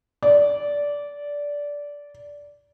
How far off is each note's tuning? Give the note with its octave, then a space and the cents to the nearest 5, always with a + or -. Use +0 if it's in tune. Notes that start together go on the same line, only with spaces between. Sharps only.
D5 -15